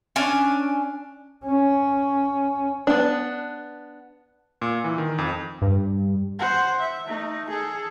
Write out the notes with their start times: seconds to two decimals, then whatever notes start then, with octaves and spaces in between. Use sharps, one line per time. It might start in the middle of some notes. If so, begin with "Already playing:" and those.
0.16 C#4 D4 G#5
1.46 C#4
2.87 B3 D4
4.62 A#2
4.84 E3
4.98 D#3
5.18 F2
5.62 G2
6.39 C5 F#5
6.79 E5
7.07 A3 D#4
7.50 G#4 A4